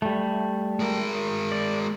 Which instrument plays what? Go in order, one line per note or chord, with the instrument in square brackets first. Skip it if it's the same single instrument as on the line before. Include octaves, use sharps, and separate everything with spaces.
[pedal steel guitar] G3 A3
[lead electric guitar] G#3 A#4
[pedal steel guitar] D5